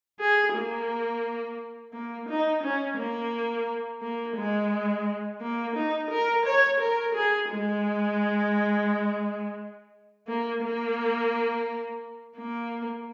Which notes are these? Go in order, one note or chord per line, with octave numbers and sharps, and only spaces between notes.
G#4
A#3
A#3
D#4
C#4
A#3
A#3
G#3
A#3
D#4
A#4
C#5
A#4
G#4
G#3
A#3
A#3
A#3